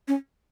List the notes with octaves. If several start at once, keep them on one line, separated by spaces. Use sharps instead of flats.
C#4